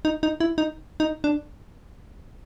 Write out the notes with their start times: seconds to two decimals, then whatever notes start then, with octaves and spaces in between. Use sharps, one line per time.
0.05 D#4
0.23 D#4
0.40 E4
0.58 D#4
1.00 D#4
1.24 D4